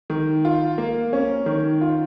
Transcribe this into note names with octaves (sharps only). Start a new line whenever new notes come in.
D#3
F4
A#3
C#4
D#3
F4